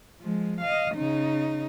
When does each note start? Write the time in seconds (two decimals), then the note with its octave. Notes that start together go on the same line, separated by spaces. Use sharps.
0.20 F3 G#3
0.61 D#5 F5
0.95 C#3 D#4